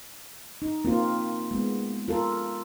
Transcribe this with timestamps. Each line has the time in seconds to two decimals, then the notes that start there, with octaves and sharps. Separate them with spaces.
0.62 D#4
0.85 A#3 C4 F4
1.51 G#3 B3
2.08 F4 A4 A#4